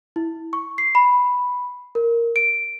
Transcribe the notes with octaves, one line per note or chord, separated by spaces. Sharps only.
E4
C#6
C7
B5
A#4
D7